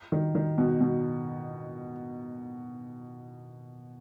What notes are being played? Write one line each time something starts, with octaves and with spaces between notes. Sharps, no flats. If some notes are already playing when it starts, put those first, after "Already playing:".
D#3
D#3
B2
B2